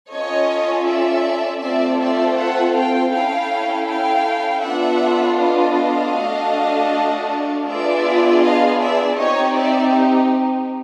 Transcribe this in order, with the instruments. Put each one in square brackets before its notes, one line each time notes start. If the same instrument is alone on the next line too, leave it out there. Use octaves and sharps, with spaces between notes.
[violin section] C#4 F4 A4 C#5 D#5
D5 E5
A3 C4 F4 A4 D5 E5
D5 E5
E5 F#5
F5 G5
C#4 E4 A4 F5 G5
F5 G5
B3 D4 F4 A4 E5 F#5
D#5 F5
A3 D4 F#4 A4
B3 D4 F4 G#4 D5 E5
D#5 F5
D5 E5
C4 D#4 G4 C#5 D#5
D5 E5